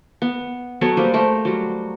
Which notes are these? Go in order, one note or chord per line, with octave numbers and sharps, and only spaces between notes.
B3
F#3 B3 A4 C#5
G3 A#3 B4 C5
A3 A#4 C5
F#3 G3